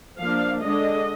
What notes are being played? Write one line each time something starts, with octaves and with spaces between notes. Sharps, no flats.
F3 A#3 D4 F5
D3 G#3 D4 D#5